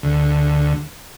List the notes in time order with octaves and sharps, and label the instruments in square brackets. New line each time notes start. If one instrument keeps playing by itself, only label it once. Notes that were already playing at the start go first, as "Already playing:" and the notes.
[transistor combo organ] D2